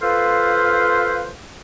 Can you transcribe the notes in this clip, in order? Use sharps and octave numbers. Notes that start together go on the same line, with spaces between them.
F4 A4 B4 C5 F5